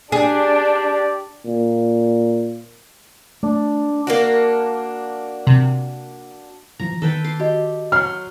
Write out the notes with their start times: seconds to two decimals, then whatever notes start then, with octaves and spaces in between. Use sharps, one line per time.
0.12 D4 G4 G#4 D5
1.46 A#2
3.43 A3 D4
4.07 A#3 D4 F#4
5.47 C3
6.79 C#3 E3 F3 A#5
7.02 D#3 A4 B4 G5
7.24 C6 D6
7.40 F#4 G4 D#5
7.92 F#3 C6 F6